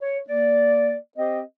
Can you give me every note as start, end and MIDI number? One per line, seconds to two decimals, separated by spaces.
0.02 0.20 73
0.28 0.95 58
0.28 0.95 74
1.18 1.41 60
1.18 1.41 67
1.18 1.41 72
1.18 1.41 75